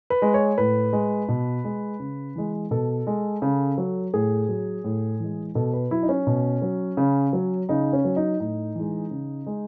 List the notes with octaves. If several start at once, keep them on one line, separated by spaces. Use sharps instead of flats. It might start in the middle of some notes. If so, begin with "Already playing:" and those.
B4
G#3
C#5
A2 B4
G#3
B2
G#3
C#3
E3 G#3
B2 A4
G#3
C#3
F#3
A2 G#4
F#3
A2
E3 G#3
B2 A4
B4
F#3 E4
D#4
C#4
B2
F#3
C#3
F#3
C#3 D#4
C#4
F#3
D#4
A2 D#4
E3 G#3
C#3
G#3